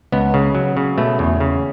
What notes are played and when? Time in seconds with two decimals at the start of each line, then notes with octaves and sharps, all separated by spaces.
0.12 C#2 B3
0.34 C#3
0.55 F#3
0.77 C#3
0.98 B2 A3
1.19 E2
1.40 C#3